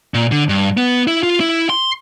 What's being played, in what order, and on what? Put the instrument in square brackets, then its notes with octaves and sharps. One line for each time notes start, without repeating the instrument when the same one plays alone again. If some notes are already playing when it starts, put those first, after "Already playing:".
[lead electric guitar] A#2
D3
G2
B3
E4
F4
E4
C6